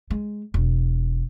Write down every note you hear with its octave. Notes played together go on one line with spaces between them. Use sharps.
G#3
E1